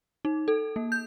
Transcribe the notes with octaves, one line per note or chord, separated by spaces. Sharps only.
D#4
A4
A#3
G6